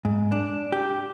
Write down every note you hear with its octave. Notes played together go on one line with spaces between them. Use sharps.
G#2
D4
G4